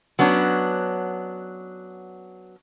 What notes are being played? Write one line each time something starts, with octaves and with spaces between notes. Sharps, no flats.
F#3 B3 C#4 D4